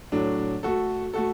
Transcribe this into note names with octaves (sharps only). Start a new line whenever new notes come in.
A2 F#3 D4
A3 F#4 A4
A3 F#4 A4